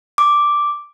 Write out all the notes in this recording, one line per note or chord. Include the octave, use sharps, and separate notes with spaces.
D6